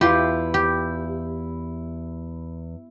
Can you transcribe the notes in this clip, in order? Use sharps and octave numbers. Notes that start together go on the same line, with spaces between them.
E2 E4 F4 G4 C6
G4